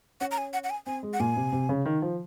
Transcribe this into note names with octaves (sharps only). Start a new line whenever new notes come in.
C#4 F#5
A#5
G#5
F#5
F#5
G#5
C4 G#5
G#3
F#5
A#2 G#5
C3
C3
C#3
D#3
F3